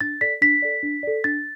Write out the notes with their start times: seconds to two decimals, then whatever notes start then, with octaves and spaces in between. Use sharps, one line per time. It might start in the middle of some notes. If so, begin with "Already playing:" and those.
0.01 D4 A6
0.21 A4 D5 B6
0.42 D4 B6
0.62 A4 D5
0.83 D4
1.03 A4 D5
1.24 D4 A6